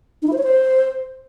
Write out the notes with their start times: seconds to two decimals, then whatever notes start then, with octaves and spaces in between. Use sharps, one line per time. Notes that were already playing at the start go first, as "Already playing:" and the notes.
0.22 D#4
0.27 E4
0.33 C5
0.38 C#5
0.43 C5